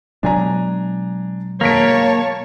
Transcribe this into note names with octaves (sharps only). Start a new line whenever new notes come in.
B2 F#3 G#3 D4 G#5 A#5
E1 A#3 C#5 A5 B6 D7